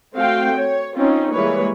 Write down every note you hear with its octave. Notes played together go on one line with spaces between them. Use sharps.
A3 C4 F#4 F5 G5
C#5
C4 C#4 D#4 F4
E3 G3 G#3 A#3 B4 C#5